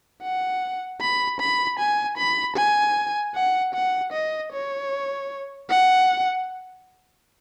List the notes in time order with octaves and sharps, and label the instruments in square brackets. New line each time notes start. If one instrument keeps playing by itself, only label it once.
[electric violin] F#5
B5
B5
G#5
B5
G#5
F#5
F#5
D#5
C#5
F#5